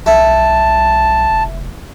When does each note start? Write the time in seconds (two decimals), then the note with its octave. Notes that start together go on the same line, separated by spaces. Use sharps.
0.06 B1 E4 A5
1.29 F1